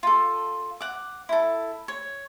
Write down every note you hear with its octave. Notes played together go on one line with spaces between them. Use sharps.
F4 A4
F#5 D6
E4 A4
C#5